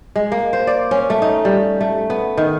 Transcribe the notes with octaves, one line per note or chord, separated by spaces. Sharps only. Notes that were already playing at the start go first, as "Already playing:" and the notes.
G#3
A#3
C5
D5
C#4
A3
D#4
G3
A3
B3
D#3